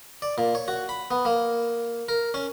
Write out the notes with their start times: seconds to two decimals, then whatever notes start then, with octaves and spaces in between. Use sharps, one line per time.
0.22 D5
0.38 A#2
0.55 C#5
0.68 F#4
0.89 B5
1.11 B3
1.25 A#3
2.09 A#4
2.34 C#4